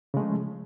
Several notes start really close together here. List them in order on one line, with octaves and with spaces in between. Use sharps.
C#3 G#3 A3 F3